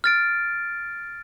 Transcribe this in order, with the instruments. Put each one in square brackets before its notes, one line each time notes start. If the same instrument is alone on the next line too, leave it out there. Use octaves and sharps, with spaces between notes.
[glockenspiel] F6 A6 D7